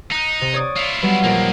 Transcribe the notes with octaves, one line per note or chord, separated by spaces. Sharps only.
D#4 F#6 B6
C3
C#5 D5 D#6
E4 F4 C#7 D7
F#3 G3 B3
A#1 D#2 A#3